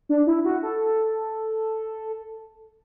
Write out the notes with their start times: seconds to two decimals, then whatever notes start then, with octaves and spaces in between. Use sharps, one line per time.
0.09 D4
0.27 E4
0.45 F#4
0.63 A4